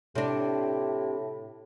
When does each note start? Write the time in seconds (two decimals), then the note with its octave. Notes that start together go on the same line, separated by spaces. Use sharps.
0.15 A2 C3 D4